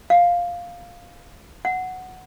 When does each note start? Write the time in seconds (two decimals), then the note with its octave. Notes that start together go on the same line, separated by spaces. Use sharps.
0.10 F5
1.65 F#5